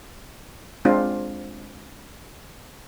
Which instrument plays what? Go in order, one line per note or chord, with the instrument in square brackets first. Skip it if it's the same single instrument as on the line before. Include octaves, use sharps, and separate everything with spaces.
[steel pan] G#3 C4 D4 F4